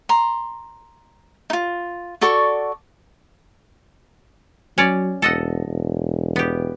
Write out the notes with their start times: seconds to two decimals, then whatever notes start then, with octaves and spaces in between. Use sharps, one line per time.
0.09 A#5 C6
1.50 D#4 F4
2.21 F#4 A4 D5 C#6
4.78 F#3 C#4 C#5 D5
5.22 E1 A4 D#5 F#5
5.67 E1
6.36 B3 G4